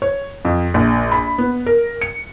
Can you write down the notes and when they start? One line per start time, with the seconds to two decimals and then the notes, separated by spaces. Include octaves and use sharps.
0.02 C#5
0.45 F2
0.74 A#1
1.12 B5
1.38 B3
1.66 A#4
2.01 C#7